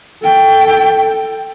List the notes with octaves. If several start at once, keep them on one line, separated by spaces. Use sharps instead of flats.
A4 G5